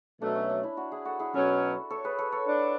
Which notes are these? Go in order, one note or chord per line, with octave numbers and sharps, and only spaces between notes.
B2 F#3 A3 D4
C#4
D4
E4
D4 F#4
E4 G#4
F#4 A4
E4 G#4
B2 F#3 C#4 F#4 A4
A4 C#5
G#4 B4
A4 C#5
A4 C#5
D4